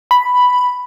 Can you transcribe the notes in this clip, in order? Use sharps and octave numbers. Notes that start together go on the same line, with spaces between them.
B5